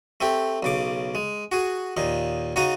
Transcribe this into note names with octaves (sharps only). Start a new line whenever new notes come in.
A3 C4 G4
B1 C#3 D6
G#3
F#4 G#4
D#2 A#2 D#4
C#3 D#4 F#4 A#5 D#6